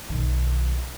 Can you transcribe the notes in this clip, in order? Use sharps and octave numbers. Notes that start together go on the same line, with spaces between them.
B1 D#3